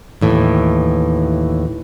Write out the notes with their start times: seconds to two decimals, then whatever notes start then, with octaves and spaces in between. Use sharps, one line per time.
0.21 D#2 A2 E3